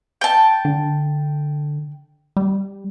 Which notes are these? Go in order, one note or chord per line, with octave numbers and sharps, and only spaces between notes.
G5 A5
D3
G3